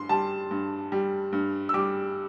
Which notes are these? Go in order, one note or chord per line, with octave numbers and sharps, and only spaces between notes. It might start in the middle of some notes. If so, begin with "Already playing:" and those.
Already playing: G2 C6
G3 A5
G2
G3
G2
E6
G3 D6